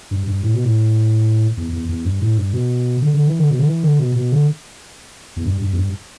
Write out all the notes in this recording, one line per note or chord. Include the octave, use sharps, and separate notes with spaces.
G2
G2
A2
B2
A2
E2
E2
E2
G2
A2
G2
B2
D3
D3
E3
D3
B2
D3
E3
D3
B2
B2
D3
E2
G2
G2
E2
G2